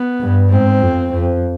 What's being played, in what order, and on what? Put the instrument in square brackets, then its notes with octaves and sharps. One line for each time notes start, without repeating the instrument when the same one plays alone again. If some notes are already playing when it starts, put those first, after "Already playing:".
Already playing: [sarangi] B3
[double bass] G2
[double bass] G#2 [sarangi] C4
[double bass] F2
F2